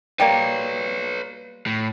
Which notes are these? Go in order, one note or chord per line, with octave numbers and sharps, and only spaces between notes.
G3 A#3 B4 C#5
A2